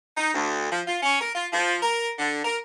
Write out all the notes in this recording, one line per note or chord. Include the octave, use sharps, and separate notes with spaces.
D#4
D2
F3
F4
C#4
A#4
F4
F3
A#4
D3
A#4